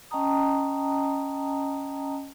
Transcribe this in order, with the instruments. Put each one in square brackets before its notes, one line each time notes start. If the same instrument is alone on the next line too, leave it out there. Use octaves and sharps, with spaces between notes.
[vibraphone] C#4 D#5 G5 A5 A#5 D#6